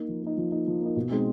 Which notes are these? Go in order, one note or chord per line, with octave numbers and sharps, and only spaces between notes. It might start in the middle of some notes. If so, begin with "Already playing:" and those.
Already playing: A#3 D#4
F3
A#3 D#4
F3
A#3 D#4
F3
A#3 D#4
B2
G#3 C4 D#4